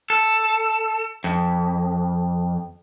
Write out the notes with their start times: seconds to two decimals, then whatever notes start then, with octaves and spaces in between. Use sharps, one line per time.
0.10 A4
1.24 F2